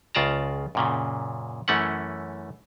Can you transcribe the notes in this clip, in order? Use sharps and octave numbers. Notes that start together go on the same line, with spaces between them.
C#2 C#3 F4 D5 A5 A#5
F#2 A#2 C#3
F#2 E3 A3 C#4 F#5